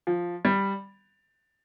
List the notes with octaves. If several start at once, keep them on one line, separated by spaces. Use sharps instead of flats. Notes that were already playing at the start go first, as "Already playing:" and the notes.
F3
G3